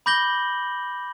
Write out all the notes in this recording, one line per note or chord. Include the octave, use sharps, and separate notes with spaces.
B5 D6 G6 A#6 F#7 G7